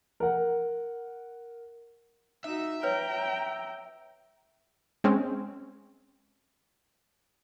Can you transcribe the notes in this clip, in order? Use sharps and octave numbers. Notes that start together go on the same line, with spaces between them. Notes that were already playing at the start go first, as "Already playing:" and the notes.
A#4 F#5
D#4 F#4 E5
B4 C#5 G5 A#5
G#3 C4 C#4